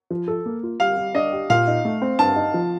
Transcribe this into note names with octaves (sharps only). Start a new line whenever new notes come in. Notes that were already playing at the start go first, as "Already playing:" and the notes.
F3
A4
A#3
F4
G3 F5
G3
D4 D#5
G4
A#2 F5
D#4
A3
C4
G2 A5
D#4
F3